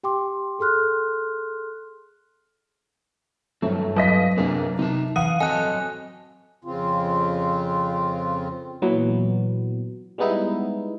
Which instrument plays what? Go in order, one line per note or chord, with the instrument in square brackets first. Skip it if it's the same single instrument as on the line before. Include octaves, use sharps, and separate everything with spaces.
[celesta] G4 G5 C6 D6
G#4 A4 C6 F6 F#6
[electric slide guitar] G2 C4 [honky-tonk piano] F#3 A3
[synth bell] F#3 [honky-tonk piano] F4 D#5 B6
[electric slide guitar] F#2 C4 G#4 [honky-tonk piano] C3 A#3 D4
[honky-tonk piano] C3 [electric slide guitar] D#4 A5
[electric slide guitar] E3 [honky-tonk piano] F5 F#5 D#7 [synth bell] D#6
[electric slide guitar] F#3 C4 D#5 [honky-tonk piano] A4 [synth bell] G#5 F#6
[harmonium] F2 C#3 C4 F4
[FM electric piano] A#2 E3 F#3 B3
G3 G#3 B3 D#4 E4